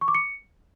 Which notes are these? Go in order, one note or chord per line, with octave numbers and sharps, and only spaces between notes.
C#6
D6
C#7